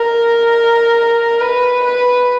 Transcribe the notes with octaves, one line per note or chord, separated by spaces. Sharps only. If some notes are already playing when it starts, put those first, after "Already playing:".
Already playing: A#4
B4
B4